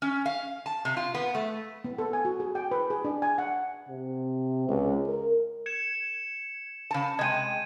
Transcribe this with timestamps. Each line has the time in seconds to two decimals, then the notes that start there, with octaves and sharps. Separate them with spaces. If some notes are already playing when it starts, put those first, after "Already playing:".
0.02 C#4
0.26 F5
0.66 A5
0.85 C3
0.97 F4
1.14 B3
1.35 A3
1.84 B3
1.98 A4
2.13 G#5
2.25 F#4
2.40 G#4
2.55 G5
2.71 B4
2.90 G#4
3.04 D4
3.22 G#5
3.38 F#5
3.89 C3
4.68 C#2
5.07 A#4
5.66 G#6 C#7 E7
6.91 C#3 A5
7.19 C3 G#3 D#5 G5 G#6 D#7